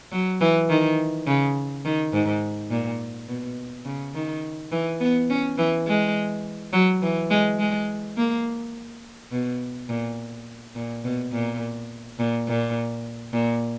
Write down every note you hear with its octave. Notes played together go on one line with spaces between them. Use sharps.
F#3
E3
D#3
C#3
D#3
G#2
A#2
B2
C#3
D#3
E3
B3
C#4
E3
G#3
F#3
E3
G#3
G#3
A#3
B2
A#2
A#2
B2
A#2
A#2
A#2
A#2